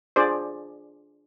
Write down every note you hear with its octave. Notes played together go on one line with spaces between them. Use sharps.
D4 F4 G#4 C5 D5